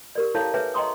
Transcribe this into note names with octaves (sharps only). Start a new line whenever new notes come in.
G4 A#4 D5
C#4 E4 A4 C#5 F5 A5
G#4 B4 C#5 E5 G5 G#5
D#5 G5 A#5 C6 C#6 D#6